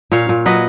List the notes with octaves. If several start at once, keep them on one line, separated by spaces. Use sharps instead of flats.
A#2 C#5 F5
A#2
F#3 B4 D#5